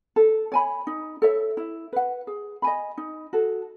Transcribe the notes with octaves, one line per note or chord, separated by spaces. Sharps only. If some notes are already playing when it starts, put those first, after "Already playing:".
A4
C#5 G#5 B5
D#4
A4 C#5 E5
E4
B4 F#5
G#4
D#5 G#5 B5
D#4
F#4 A4